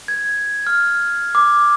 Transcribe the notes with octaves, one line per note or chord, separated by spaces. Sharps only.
G#6
F6
D6